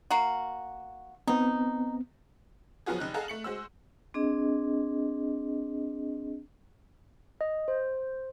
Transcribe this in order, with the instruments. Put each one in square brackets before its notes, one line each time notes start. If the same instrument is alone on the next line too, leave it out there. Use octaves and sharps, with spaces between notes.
[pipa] A#3 F#4
[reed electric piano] B3 C4 [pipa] D#4
[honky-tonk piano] F3 F#3 B3 F4 F#4 G#4
F1 D#4 F#6
G#4 A4 D#5 F5 F#5 A#5
A3 C#7 F#7
G#3 F#4 C5 E6
[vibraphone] C4 D4 G#4 D#5
[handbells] D#5
C5